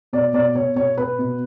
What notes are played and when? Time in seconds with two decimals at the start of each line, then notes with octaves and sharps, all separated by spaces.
0.13 B2 D5
0.34 B2 D5
0.55 B2 C#5
0.76 B2 C#5
0.98 B2 B4
1.19 B2